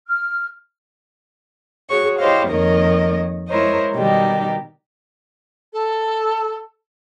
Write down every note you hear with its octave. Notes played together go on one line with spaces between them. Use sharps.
F6
F#4 G#4 C#5 C#6
E4 G4 C5 C#5 D#5 F5
F2 D#3 A#3 A#4 C#5 D#5
G#3 E4 A#4 C5 C#5 D#5
B2 D#3 G3 D#4 G4
A4